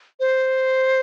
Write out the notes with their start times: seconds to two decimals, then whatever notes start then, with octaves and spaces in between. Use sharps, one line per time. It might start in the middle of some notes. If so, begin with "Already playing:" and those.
0.20 C5